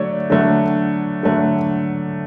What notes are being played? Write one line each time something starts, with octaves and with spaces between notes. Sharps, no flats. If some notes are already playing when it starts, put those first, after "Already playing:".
Already playing: D3 F#3 A3 C#5 D5
D3 F#3 A3
D3 F#3 A3